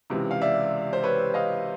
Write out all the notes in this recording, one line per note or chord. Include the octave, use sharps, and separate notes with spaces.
C#2 C3 E3
F5
D5 E5
C5
B4 C#5
D#5 F5